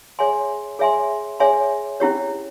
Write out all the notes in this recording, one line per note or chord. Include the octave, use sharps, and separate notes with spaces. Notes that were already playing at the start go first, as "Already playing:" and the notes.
G#4 C#5 E5 G#5 C6
G#4 C#5 E5 G#5 C6
G#4 C#5 E5 G#5 C6
C#4 E4 G4 C#5